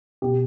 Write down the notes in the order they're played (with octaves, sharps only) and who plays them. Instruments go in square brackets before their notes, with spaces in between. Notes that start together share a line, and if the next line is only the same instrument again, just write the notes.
[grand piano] B2 [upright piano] G4